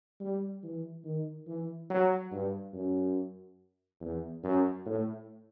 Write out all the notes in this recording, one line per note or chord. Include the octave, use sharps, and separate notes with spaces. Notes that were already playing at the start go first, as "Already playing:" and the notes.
G3
E3
D#3
E3
F#3
G2
F#2
E2
F#2
A2